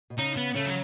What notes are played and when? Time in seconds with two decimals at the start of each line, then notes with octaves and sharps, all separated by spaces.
0.10 B2
0.18 C#3 D#4
0.36 B3
0.54 C#3 A3
0.65 F#3